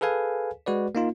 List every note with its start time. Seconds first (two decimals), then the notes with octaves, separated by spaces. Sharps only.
0.01 G#4 A4 B4 F5 G#5
0.66 G#3 F#4 B4 D5
0.95 A#3 D#4 F4